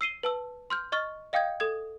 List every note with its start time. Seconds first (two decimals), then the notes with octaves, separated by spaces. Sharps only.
0.01 E6 C7 D#7 G7
0.23 B4 A5 E6
0.70 C6 F6 G6
0.92 D#5 C#6 F6 A6
1.33 D#5 F5 G5 D#6 G6 G#6
1.60 A4 D#6 G#6